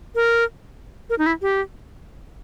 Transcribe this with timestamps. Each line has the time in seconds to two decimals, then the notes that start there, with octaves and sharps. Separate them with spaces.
0.15 A#4
1.10 A#4
1.19 D#4
1.26 E4
1.42 G4